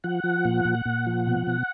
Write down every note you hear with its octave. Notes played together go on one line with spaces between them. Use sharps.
F3 F#5
F3
A#2
A#2
A#2
F3
B2
B2